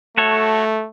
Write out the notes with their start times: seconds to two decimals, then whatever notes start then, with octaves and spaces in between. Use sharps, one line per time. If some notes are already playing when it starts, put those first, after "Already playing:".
0.17 A3 F#4 A4 C#5